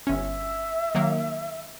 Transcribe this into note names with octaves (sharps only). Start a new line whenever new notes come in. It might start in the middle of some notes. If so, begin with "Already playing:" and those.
G1 C#4 E5
D#3 F#3 A#3